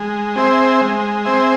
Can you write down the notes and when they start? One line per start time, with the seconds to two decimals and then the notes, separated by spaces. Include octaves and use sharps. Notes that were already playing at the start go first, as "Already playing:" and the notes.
Already playing: G#3
0.36 C4 G#4 C5 E5
0.81 G#3
1.25 C4 G#4 C5 E5